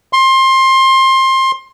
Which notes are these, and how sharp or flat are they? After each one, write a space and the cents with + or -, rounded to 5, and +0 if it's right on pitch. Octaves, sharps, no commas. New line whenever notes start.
C6 +20